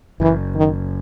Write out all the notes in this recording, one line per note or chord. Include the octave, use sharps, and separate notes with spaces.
F#1 F#2 E3
D#3